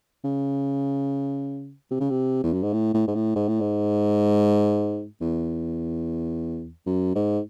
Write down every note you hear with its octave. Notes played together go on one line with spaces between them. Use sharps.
C#3
C3
C#3
C3
E2
F#2
G#2
A2
A2
G#2
A2
G#2
A2
G#2
E2
F#2
G#2